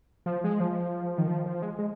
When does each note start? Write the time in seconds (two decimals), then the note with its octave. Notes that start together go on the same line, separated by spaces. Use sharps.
0.26 F3
0.44 G#3
0.60 F3
1.18 D#3
1.28 F3
1.46 F3
1.62 G#3
1.78 G#3